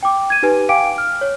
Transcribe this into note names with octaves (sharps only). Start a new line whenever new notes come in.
G5 D6
G#6 D#7
D#4 G4 B4 G#5
F5 G5 G#5 D6 D7
F6
C#5